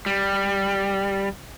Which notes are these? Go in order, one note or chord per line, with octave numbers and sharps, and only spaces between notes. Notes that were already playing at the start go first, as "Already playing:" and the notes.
G3